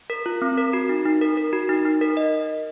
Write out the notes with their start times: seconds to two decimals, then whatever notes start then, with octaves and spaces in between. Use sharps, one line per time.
0.10 A#4
0.26 F4
0.42 C4
0.58 A#4
0.73 F#4
0.89 D#4
1.06 D#4
1.21 A#4
1.37 A#4
1.53 F#4
1.69 D#4
1.85 D#4
2.01 A#4
2.17 D#5